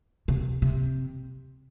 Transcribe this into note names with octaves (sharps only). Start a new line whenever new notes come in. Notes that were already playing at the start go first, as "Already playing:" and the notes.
C3
C3